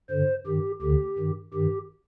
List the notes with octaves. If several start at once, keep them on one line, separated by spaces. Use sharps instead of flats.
G2 D3 C5
G2 D#3 G4
D2 D3 G4
G2 D#3
G2 D#3 G4